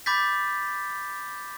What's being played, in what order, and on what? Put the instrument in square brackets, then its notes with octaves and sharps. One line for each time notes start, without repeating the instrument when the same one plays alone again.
[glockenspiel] B5 D6 G6 A6 B6